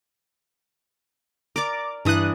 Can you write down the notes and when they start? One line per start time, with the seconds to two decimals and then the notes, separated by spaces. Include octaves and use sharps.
1.56 A#4 D5 D6
2.05 G2 E3 D4 D#6 F#6